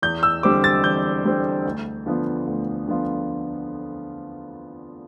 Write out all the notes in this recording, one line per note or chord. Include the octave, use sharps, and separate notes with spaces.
E2 G6
E6
D3 G3 C4 D6
A6
E2 G6
D3 G3 C4
D2
D3 F3 B3 F4
D2
D3 F3 B3 F4